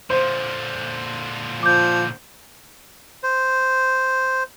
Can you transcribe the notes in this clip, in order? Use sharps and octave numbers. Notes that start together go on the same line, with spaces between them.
A#2 D3 C5
F3 D6 G6
C5